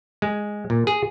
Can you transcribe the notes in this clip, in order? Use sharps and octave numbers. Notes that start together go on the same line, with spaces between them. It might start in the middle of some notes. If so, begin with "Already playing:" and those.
G#3
A#2
G#4